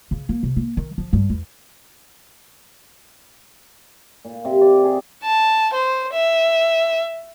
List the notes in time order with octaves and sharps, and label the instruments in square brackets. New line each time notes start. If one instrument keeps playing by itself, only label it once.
[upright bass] C#3
A#3
C3
A#3
D#3
F3
G2
E2
[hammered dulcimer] A#2
C3
D5
G#4
[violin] A5
C5
E5